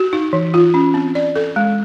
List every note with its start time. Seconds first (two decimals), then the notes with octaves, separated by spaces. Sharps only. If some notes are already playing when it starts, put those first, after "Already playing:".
Already playing: F#4
0.13 D#4
0.33 E3
0.54 F4
0.74 C#4
0.94 C4
1.15 D5
1.36 A4
1.56 G#3